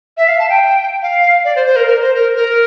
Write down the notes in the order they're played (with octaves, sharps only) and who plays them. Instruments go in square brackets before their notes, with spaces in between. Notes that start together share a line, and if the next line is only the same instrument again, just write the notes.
[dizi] E5
F5
A5
G5
F5
D5
C5
C5
A#4
A#4
C5
A#4
A#4